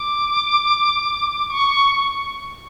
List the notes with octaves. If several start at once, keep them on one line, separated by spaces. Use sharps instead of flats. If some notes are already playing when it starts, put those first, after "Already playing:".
Already playing: D6
C#6